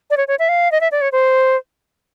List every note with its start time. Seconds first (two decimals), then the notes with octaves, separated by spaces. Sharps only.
0.11 D5
0.17 C#5
0.28 C#5
0.39 E5
0.49 F5
0.72 D#5
0.81 E5
0.92 D5
1.01 C#5
1.12 C5